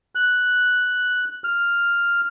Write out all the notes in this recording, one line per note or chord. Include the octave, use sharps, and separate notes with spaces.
F#6
F6